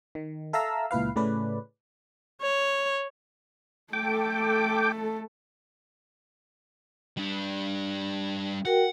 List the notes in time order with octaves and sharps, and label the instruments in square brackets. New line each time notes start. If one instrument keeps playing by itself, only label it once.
[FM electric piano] D#3
A4 E5 F5 A5 A#5 E6
C#2 A#2 E4 B4 F5
A2 C#3 A3 C#4 B4 D5
[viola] C#5
[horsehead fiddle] A3 A4 [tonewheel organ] G5 D6
[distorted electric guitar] G3 D4
[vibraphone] F#4 A#4 G5 [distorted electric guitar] F#5